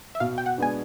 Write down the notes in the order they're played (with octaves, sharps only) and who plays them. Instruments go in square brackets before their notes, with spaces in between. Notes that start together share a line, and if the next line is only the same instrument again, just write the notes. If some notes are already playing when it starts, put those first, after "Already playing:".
[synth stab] E5
[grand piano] B2 [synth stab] F5
[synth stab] G5
F#5
[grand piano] G#3 B3 D4 [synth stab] G#5